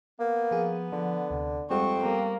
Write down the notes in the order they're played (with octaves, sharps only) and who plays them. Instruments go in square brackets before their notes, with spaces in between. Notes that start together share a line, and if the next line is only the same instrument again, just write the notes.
[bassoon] A#3 [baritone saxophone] B3
[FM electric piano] F3 G#4
[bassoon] D3 [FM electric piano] F3
[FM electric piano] D2 C3
[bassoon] F2 [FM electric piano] G3 G#3 F#5 [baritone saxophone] C4 [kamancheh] C#6
[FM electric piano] G3 B3 [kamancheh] A#3